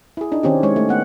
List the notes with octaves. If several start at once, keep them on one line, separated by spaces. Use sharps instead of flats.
E4 G#4
D4 D#4
D#3 C4 C#4 G4
G#3 C#5
A3
B3 F#5